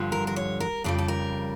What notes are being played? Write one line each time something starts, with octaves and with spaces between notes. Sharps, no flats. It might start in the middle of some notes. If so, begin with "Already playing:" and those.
Already playing: G2 D3 F3
A#4
A#4
C#5
A#4
F2 C#3 G3 A4
A4
A#4